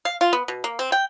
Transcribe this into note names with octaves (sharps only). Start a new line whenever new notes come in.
F5
F4
B3
B2
A#3
C4
G5